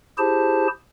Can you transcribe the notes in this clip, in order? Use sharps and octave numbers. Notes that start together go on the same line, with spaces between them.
E4 G4 G#4 C5 A5